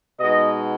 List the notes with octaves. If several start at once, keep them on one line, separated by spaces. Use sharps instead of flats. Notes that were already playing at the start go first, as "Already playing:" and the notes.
B2 G#3 B3 D#4 D#5